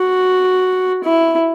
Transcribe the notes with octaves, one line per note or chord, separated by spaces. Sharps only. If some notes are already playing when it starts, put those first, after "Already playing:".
Already playing: F#4
E4